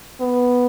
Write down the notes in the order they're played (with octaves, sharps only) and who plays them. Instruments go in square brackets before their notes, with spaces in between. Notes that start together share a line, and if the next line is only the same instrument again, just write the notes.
[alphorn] B3